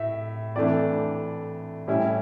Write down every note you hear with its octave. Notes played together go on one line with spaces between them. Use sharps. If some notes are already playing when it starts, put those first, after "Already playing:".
Already playing: A2 E5
F2 E3 A3 D4 D5
A2 G3 C#4 E4